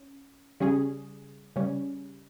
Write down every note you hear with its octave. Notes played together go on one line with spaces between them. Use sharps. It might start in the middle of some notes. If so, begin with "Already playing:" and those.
Already playing: C#4
C#3 G3 C#4 G#4
C#3 G3 C#4